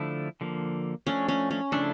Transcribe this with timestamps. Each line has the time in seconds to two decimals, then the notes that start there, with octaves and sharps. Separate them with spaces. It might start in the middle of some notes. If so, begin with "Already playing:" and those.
Already playing: D3 F3 A3 E4
0.41 D3 F3 A#3
1.07 F3 A3 C#4 D4
1.28 C#4
1.51 C#4
1.72 C#3 F3 A3 D4 E4 A4